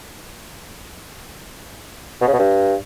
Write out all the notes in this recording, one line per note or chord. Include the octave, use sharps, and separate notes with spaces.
B2
C#3
B2
G2